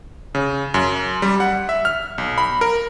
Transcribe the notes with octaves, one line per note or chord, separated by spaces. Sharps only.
C#3
F#2
G3
F#5
E5
F6
B1
B5
A#4